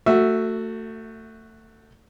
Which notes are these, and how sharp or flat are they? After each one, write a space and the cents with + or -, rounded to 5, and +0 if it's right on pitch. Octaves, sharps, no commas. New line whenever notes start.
A3 +25 F#4 +0 E5 +0